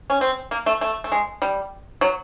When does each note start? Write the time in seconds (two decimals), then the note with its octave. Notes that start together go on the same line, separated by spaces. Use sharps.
0.10 C#4
0.21 C4
0.51 A#3
0.66 A3
0.81 A3
1.04 A3
1.12 G#3
1.42 G3
2.01 F#3